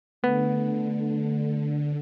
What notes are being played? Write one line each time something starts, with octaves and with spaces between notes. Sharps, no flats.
D3 A3 B3